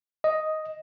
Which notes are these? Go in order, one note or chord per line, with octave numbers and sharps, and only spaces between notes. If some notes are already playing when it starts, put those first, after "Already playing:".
D#5